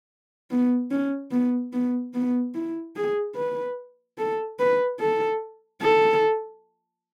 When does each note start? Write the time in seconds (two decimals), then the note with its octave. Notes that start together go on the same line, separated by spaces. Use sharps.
0.51 B3
0.91 C#4
1.31 B3
1.73 B3
2.14 B3
2.54 E4
2.96 G#4
3.36 B4
4.18 A4
4.59 B4
5.00 A4
5.82 A4